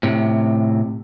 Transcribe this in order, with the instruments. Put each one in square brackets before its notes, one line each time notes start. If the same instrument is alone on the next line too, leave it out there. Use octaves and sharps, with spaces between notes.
[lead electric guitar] A2 C3